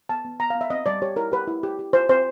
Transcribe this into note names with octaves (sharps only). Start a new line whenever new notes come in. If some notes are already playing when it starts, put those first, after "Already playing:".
B3 A5
B3
B3 A#5
F5
B3
E5
C4 D#5
G3 D5
G4 C#5
E4 A#4
G4 B4
E4
G4
G4
F4 C5
C4 C5